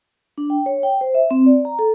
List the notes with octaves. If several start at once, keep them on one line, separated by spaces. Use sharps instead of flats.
D4
G5
C#5
G5
C5
E5
C4
D5
A#5
A4